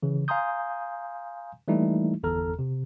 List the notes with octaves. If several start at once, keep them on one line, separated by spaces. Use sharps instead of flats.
C#3 E3
F5 G#5 A#5 C6 D#6 G6
E3 G3 A3 A#3 D#4 E4
G1 E2 A4 A#5 F6
C3